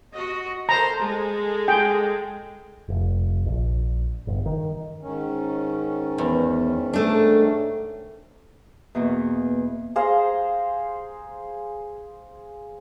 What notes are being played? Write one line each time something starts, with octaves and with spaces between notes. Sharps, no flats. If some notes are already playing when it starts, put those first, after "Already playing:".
F#4 D#5
A4 A#4 C5 A#5
G#3 A4
G#4 G5
F1
A#1
G1
D#3
G#2 D#3 C#4
E2
A3 D4
E2 B2 A#3
G#4 C5 F5 A#5